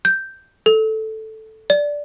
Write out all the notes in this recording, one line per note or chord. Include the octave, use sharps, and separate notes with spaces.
G6
A4
D5